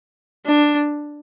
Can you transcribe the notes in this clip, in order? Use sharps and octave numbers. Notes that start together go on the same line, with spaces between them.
D4